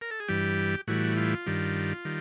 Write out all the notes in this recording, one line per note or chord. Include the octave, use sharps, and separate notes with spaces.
A#4
A4
G#4
G2 E3 G3 G4
A2 E3 G3 F#4
F4
G2 D#3 G3
D#3 G3